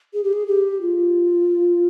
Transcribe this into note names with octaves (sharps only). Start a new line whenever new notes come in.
G#4
G4
G#4
G4
F4